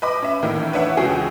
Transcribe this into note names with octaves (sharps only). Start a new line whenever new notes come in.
B4 D#5 B5 D6
C#4 E5
A2 D#3 E3 A#3
D4 B4 C#5 E5 F#5
C#2 E3 C#4 F#4 G#4 G5